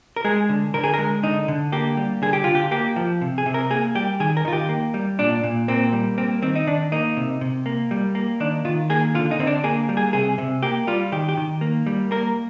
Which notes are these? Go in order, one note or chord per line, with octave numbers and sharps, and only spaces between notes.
A#4
G#3 G#4
D3
D3 A#4
G#4
A#4
G#3
D3 D#4
D3
A#3 G4
G3
D3 G#4
G4
D3 F4
G4
A#3 G4
F3
C3
G#4
C3
A#4
A#3 G#4
G3 G4
D#3 G#4
A#4
D#3 F4
G4
A#3
G3
A#2 D4
A#2
A#3 C4
G3
A#3 C4
D#3 C4
D#4
D#3 D4
A#3 D#4
C3
C3
A#3
G3
A#3
D#3 D4
D#3 F4
A#3 G#4
D3 F4
D#4
D3 C4
D4
A#3 G#4
G3
G#4
C3 G#4
C3
A#3 G4
G3 F4
D#3 G4
G4
D#3
A#3
G3
A#3 A#4